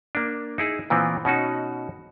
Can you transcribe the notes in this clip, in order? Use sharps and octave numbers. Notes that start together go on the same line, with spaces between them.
A#3 D4
D#4 E4 G#4
A#2 E3 B3 C4
B2 C#4 D#4 F#4